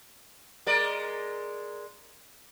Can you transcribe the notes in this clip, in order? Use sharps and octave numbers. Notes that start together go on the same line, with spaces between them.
G#3 A#4 D5